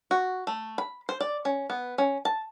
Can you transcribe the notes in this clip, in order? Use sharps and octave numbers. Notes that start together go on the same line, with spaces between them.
F#4
A3
B5
C5
D5
C#4
B3
C#4
A5